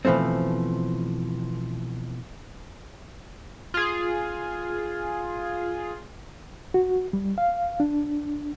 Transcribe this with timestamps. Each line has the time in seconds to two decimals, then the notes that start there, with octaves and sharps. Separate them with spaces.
0.05 B2 E3 F3 A3 C4
3.74 F4 G#4
6.74 F#4
7.13 G3
7.38 F5
7.80 D4